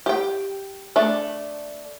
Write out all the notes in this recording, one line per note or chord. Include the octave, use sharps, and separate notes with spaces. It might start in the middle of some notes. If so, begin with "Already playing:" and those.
G4 G5
A3 D4